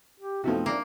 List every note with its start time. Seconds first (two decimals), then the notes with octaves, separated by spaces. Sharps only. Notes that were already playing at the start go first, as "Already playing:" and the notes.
0.20 G4
0.44 C3 F3 A3 B3 C4 D#4 F#4
0.66 A#3 D4 A#4 E5